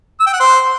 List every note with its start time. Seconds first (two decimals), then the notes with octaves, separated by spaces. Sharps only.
0.20 E6
0.27 G5
0.33 F#5
0.40 C5